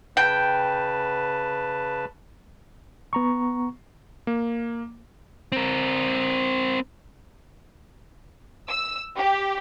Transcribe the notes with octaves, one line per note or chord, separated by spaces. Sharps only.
C#3 B4 G5 A5
B3 A#5 C#6
A#3
C4 A#4
E6
G4